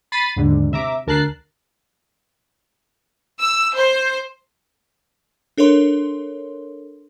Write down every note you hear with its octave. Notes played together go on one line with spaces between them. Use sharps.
B5 A6 B6 C7 D#7
D#2 G#2 D3
C3 E5 A#5 D6
D2 A#4 A5 F#6 C7
E6
C5
D4 A4 A#4 C#5 C6